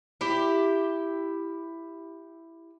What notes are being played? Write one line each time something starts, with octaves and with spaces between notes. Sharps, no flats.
E4 G4